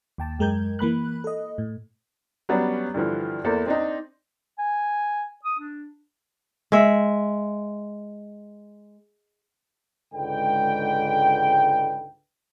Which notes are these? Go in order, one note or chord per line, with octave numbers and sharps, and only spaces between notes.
D#2 G5 A5
F#2 G#3 A#4 G6 G#6
E3 A#3 B5 F#6
A4 D#5
A2
F#3 G3 B3 C#4 D4
G2 D3 E3 F3
E2 A#3 A4 C5
C4 D4 D#4
G#5
D#6
D4
G#3 E5
C#2 G#2 D3 B4 G5